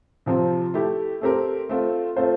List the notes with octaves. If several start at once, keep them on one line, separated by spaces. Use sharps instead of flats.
C3 F3 C4
A3 E4 G4
A3 C4 G4 A#4
A3 C4 F4
A3 C4 F4 C5